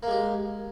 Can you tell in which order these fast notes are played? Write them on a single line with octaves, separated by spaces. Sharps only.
A#3 G#3 G4